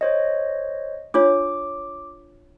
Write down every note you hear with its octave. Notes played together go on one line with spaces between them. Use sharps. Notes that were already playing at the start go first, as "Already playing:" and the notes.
C5 C#5 D#5
D4 F4 C#5 D6